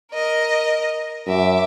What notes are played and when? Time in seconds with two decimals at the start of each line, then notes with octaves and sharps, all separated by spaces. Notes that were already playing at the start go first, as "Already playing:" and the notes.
0.12 A#4 D#5
1.27 F#2 E5 D6